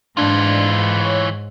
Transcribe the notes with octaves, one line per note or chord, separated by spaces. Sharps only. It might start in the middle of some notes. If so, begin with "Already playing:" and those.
G#2 E3 D4 F4
C#5